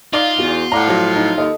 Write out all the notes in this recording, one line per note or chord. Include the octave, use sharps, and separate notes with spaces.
D#4 F4 D5 F5
E2 B3 F#4
A2 D5 F5 F#5 A#5 D6
F3 F#3
D#4
D#2 A4 D#5